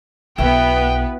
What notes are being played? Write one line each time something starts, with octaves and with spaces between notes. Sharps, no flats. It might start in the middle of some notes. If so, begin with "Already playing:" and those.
B1 B3 D4 E4 F#4 B4 G5